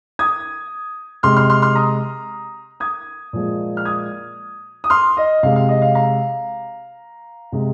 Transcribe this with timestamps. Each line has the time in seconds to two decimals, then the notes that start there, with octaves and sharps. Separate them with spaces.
0.19 D#6 G#6
1.23 C3 G#3 C6 F6
1.37 C6 F6
1.50 C6 F6
1.62 C6 F6
1.75 A#5 D#6
2.80 D#6 G#6
3.33 A#2 F3 G#3
3.77 F6
3.85 D#6 G#6
4.84 D#6
4.90 C6 F6
5.17 D#5
5.43 C3 G#3 F5
5.56 F5
5.69 D#5
5.82 F5
5.95 F5 A#5
7.52 C3 G#3